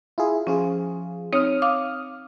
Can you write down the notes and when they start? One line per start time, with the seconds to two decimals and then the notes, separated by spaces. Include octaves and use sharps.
0.18 E4 F4 G#4
0.47 F3 C#4 F4 G#4
1.33 C4 D#4 C#5 D#6 F6
1.62 F5 D6